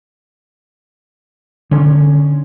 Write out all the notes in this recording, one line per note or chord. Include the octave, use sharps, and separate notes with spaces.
D3 C#4